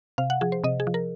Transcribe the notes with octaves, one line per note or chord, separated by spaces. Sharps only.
C3 F5
F#5
F3 G#4
C5
C3 D#5
G#4
F3
A#4